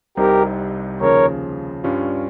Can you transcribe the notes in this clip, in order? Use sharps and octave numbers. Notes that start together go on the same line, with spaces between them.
C2 C3 G3 C4 D#4 G4 A#4
D#2 C#3 F3 A#4 C#5
G2 G3 C#4 F4